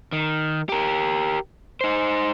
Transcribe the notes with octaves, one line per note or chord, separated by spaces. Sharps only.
D#3
G4 A#4
D#4 C5